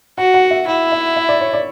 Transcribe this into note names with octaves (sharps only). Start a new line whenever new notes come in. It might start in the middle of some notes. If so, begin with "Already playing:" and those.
F#4 F#5
F#5
E5
E4 F#5
E5
E5
D5
C#5
D5